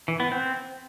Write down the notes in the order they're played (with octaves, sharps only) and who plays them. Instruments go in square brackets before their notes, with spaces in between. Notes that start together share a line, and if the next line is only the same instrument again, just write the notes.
[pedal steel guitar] E3
B3
C4